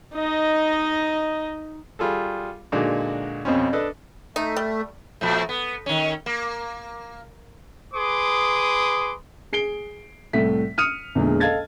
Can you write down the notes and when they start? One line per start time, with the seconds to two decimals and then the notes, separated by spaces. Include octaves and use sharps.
0.14 D#4 D#5
1.99 G3 F4 G#4 A4
2.72 A#2 D3 G#3 D4 D#4 F#4
3.45 F2 B2 C4 C#4
3.73 D4 A4 B4 D#5
4.36 A3 D#4
4.56 G3
5.21 A#2 F3 A3
5.49 B3
5.86 D#3 C#4
6.26 A#3
7.94 G#4 B4 C6 D6 D#6
9.53 G#4 C7 D7 G7
10.33 C2 A2 A3 B6
10.78 D#6 F6 C#7 D#7
11.15 E2 A#2 D3 G#3
11.40 A4 D#5 F5 A5 G#6 A6